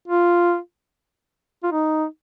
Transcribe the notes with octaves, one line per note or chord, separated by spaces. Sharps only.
F4
F4
D#4